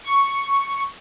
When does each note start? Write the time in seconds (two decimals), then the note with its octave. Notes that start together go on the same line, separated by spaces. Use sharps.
0.04 C#6